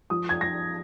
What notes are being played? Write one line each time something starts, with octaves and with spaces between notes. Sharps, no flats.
F3 D#6
G#6
F3 A#6